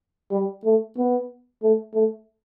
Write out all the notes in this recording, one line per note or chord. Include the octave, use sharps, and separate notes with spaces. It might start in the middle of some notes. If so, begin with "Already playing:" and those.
G3
A3
B3
A3
A3